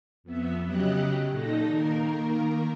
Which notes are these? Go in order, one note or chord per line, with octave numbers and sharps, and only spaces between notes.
F2 B3 E5
C#3 F#3 G4 D#5 F#6
A#2 D#4 A4 A#6
D#3 A#3 A#4